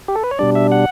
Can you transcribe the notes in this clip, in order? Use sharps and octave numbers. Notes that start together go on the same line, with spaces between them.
G4
A4
B4
C#5
B2 G3 D4 D5
E5
F#5